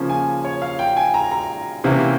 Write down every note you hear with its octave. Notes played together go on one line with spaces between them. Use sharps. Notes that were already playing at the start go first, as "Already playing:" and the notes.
Already playing: C#3 F3 A#3 C#4
G#5
C#5
F5
G5
G#5
A#5
A#5
C3 E3 A#3 C#4 E4